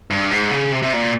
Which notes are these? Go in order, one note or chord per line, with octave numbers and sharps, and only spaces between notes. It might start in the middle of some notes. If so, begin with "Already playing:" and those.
G2
G#2
C#3
C3
C3
A#2